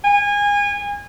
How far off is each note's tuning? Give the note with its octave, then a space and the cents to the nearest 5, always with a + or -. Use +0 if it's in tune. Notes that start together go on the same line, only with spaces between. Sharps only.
G#5 -25